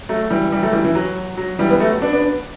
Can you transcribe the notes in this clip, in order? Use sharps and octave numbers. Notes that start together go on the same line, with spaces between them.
F#3 A3
E3 G3
E3 G3
F#3 A3
E3 G3
E3
F#3
F#3
E3 G3
B3
F#3 A3
B3 D4
B3 D4